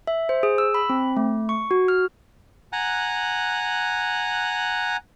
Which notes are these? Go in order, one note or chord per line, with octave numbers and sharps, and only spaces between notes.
E5
C5
G#4
E6
B5
C4
A3
C#6
F#4
F6
F#5 G#5 A#5 F#6